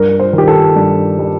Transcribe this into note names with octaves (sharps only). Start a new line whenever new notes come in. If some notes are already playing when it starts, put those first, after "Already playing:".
Already playing: G2 A#4
C5
D#3 G4
A4
G2
G3